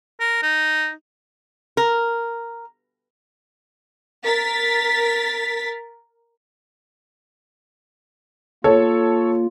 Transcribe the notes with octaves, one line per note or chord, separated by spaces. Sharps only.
A#4
D#4
A#4
A#4 A6 B6
A#3 F4 A4 C#5